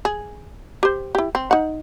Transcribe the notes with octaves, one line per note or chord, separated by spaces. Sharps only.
G#4
G4 C5
E4 G4
C4
D#4 F#5